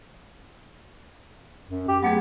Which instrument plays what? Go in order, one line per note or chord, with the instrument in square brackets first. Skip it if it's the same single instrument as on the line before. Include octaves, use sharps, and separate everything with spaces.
[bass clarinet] F#2
G4
[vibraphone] F#3 A3 G#4 [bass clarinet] B3